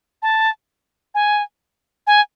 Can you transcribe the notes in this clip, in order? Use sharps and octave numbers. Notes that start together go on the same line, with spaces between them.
A5
G#5
G#5